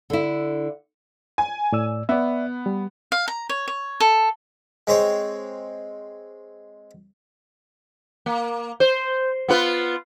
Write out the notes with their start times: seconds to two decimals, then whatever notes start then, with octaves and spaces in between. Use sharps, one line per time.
0.10 D3 E4
1.38 G#5
1.72 A2 D5 E6
2.09 B3 D5 E5
2.66 G3
3.12 F5
3.28 A#5
3.49 C#5
3.68 C#5
4.00 A4
4.87 G#3 C4 C#5
8.26 A#3
8.80 C5
9.49 B3 F4 B4